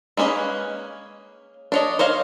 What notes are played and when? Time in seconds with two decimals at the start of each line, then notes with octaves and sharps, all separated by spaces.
0.17 G#3 A#3 C#4 B4 D#5
1.72 D4 C#5 D#5
1.99 C5 C#5 D#5 F5